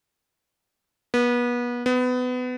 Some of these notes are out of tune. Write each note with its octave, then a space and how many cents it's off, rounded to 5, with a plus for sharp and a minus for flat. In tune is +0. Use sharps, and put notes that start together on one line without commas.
B3 -30
B3 +25